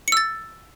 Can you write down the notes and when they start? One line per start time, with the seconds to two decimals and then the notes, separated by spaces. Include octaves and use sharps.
0.08 C#7
0.12 E6
0.17 A6